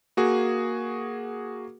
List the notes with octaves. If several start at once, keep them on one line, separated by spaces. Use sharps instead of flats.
A#3 F#4 G#4